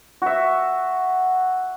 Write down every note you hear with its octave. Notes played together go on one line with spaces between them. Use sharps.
F#4 E5